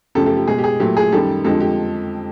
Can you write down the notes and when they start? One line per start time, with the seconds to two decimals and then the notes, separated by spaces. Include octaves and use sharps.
0.15 F#2 C#3 F3 A3 G4 A4
0.26 G4 A4
0.37 G4
0.48 B2 G#3 G#4
0.58 G4
0.64 G#4
0.80 A#2 F#3 A3 G4
0.97 G#4
1.12 F#2 D#3 G3 G4 A4
1.44 F2 D3 F3 G#3 G4 A4
1.60 G4